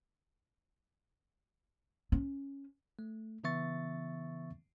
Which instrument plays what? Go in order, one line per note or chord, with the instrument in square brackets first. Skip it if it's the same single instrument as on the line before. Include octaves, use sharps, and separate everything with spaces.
[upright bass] C#4
[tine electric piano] A3
C#3 E3 B3 E5 C#6 A6